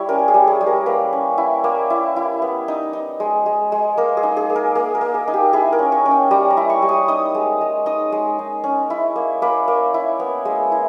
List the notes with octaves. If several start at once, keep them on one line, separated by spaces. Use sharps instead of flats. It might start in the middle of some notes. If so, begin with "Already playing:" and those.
Already playing: G3 E4 C#5
C#4 A#4
G#4
G3
G#4
G3
A#4
A#3 B4
C#4
E4
A#3
E4
E4
B3
D#4
D#4
G#3
G#3
G#3
A#3 A#4
G#4
D#4
G#4
A#3
A#4
A#3 G#4
A#4
A#3
G#4
D#4
G4
E4 G#4
A#4
C#4
C#5
C#4
G5
G3 A#5
A#5
E4
C#6
G3
D#6
D#4 D#6
G#3
G#3
D#4 D#6
G#3
D#4
C#4
E4
A#3
A#3 B5
A#3
E4
B3
G#3
E4